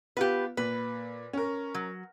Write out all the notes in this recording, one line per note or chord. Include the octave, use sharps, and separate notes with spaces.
B3 F4 G4 B4
A#2 B4
C#4 A#4
F#3